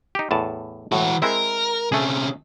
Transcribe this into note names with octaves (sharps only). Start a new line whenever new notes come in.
D#4 G4
E2 A2 A5
A2 E3 F#4
G#3 C4 E4 A#4
C3 A3 C#4 G#4